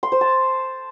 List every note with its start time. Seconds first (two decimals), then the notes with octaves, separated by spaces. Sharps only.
0.03 C6
0.12 C5
0.21 A5